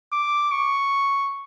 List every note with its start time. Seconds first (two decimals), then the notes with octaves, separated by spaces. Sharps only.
0.13 D6
0.52 C#6